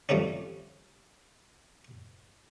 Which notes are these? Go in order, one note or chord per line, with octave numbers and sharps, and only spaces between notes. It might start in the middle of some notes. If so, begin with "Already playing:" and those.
F3 G3 A3 C4 C#4